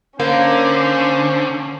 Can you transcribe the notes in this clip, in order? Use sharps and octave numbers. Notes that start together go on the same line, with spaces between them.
D3 A#3 C#4 C5